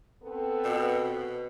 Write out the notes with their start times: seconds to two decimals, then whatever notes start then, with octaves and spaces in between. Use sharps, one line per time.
0.23 B3 C4 A4
0.64 B2
1.04 B2